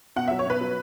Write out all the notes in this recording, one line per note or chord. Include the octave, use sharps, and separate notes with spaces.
B2 F#5
E5
F#3
C#5
B2 B4
F#3